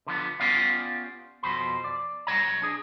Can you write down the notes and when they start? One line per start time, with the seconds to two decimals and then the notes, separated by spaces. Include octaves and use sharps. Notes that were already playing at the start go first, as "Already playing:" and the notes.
0.07 D3 F3 B3
0.40 B3 C#4 F4 G4 D5 F5
1.43 F2 B2 C5 B5
1.84 D5
2.27 B1 C#5 D#5 A#5
2.62 D4 G#4